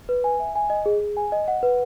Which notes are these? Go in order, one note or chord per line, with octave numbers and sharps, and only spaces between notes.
B4
G#5
E5
G#5
D#5
G#4
G#4
G#5
D#5
F#5
B4